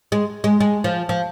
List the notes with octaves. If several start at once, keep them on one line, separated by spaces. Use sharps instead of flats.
G#3
G#3
G#3
F3
F3